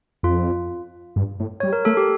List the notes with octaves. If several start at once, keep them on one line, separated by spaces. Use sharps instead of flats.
F2 F4
G2
A2
G3 C#5
A#4
A3 A4
G4